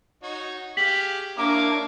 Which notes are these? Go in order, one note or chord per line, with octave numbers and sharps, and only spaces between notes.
D#4 F#4 C#5
G4 G#4 F5 B6 F#7
A#3 D4 E4 A#4 C#5 D6